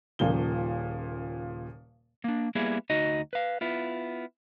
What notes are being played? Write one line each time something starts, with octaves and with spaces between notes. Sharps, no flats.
D#1 A#2 C#3 F3 G7
A#3 D4
G3 A#3 B3 E4 G#4
D2 D#4 F#4 D#5
B4 F5
B3 E4 F4